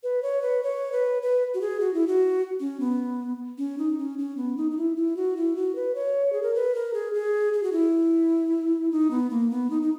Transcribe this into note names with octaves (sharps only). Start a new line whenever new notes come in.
B4
C#5
B4
C#5
B4
B4
F#4
G#4
F#4
E4
F#4
C#4
B3
C#4
D#4
C#4
C#4
B3
D#4
D#4
E4
E4
F#4
E4
F#4
B4
C#5
G#4
A#4
B4
A#4
G#4
G#4
G#4
F#4
E4
D#4
B3
A#3
B3
D#4
D#4